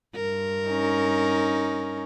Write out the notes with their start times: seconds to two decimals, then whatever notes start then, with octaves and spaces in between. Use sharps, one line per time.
0.15 G2 A#4
0.69 C#4 D#4